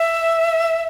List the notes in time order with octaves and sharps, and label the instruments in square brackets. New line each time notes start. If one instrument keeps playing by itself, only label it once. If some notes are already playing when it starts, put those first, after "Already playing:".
Already playing: [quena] E5